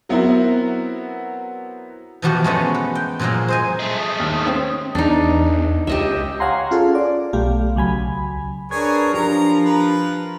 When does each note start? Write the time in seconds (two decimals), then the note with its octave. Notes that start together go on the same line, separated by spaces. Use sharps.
0.09 F#3 B3 C4 E4 F#4 A#4
2.22 B2 E3 F3 A3 F#4 G4
2.44 G#3 A3 B3 C#4
2.74 B4
2.95 G5
3.19 A#2 F3 F#3 G#3 A#3
3.48 C5 D#5 G#5
3.79 G#3 A3
3.99 D#6
4.20 D#2
4.45 C4 C#4
4.95 E2 D4 D#4
5.87 C#2 G4 D#5 E5
6.40 C#5 F5 F#5 G#5 A#5 C6
6.71 C#4 F4 G#4 A4
6.95 D5
7.33 B1 A3 G4 F5
7.76 C#2 F#3 G#5 B5
8.71 D4 G#4 A#4 B4 C#5 G#6
9.14 F3 D4 G4 A#4 A#5
9.65 B4